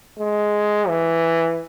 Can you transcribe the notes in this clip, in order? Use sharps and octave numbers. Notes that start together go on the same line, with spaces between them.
G#3
E3